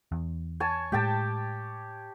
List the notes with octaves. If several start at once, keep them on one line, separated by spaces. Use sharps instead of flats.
E2
C#5 G#5 A5
A2 G#3 G4 G5 A5